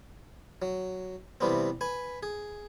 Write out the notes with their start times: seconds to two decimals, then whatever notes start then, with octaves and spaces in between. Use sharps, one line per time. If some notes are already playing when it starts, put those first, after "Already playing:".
0.62 F#3
1.40 C3 E3 G3 B3 C4
1.81 B4 G#5 B5
2.23 G#4